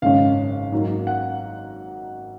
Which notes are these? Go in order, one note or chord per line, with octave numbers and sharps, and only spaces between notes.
G#1 F#2 C#3 G#3 C#4 F5
G#2 F#3 A#3
F#5